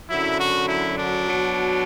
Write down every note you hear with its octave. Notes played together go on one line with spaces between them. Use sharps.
F#2 D3 F#3 E4
F#4
E4
D4
B2 F#3